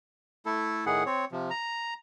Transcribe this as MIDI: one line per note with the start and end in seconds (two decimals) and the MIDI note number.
0.46 0.85 57
0.46 0.85 64
0.46 0.85 69
0.86 1.04 45
0.86 1.04 51
0.86 1.04 68
0.86 1.04 78
1.06 1.25 60
1.06 1.25 73
1.32 1.50 48
1.32 1.50 53
1.50 1.94 82